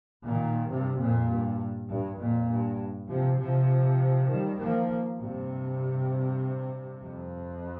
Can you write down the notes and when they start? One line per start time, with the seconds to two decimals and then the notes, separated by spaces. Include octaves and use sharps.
0.24 A#2 D#3
0.69 G2 C3
0.99 F2 A#2
1.28 G2
1.89 G2
2.19 F2 A#2
2.50 G2
3.09 C3 F3
3.39 C3 F3
4.30 D#3 G3
4.60 F3 A#3
5.20 G2 C3
7.01 F2